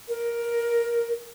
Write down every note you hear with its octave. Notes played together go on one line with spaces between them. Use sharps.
A#4